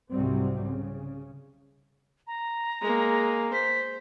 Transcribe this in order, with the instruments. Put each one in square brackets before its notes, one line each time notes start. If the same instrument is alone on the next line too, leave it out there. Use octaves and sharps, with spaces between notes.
[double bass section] C2 G#2 C3 F#3 G3 C4
C#3
[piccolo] A#5
[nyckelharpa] G#3 A#3
[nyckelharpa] C5 [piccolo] B6